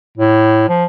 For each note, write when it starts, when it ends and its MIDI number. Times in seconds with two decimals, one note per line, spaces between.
0.18 0.68 45
0.69 0.85 53